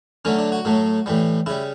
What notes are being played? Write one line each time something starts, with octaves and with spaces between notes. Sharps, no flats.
D3 F#3 A3 C#4
D4
F#4
A2 F#3 A3
A2 E3 G3
C#3 G3 E4